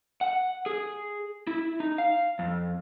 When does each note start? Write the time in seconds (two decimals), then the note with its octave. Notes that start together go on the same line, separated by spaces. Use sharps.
0.21 F#5
0.66 G#4
1.47 E4
1.80 D#4
1.98 F5
2.39 F2